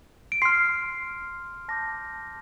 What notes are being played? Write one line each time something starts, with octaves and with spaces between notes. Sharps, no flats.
D7
C6 F6 C7
A5 D6 G6 A#6